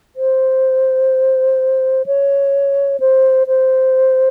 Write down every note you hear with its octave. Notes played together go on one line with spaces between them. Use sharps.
C5
C#5
C5
C5